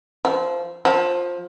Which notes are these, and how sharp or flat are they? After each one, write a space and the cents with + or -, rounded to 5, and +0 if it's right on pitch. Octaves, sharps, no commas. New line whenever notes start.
F3 -15
F3 +15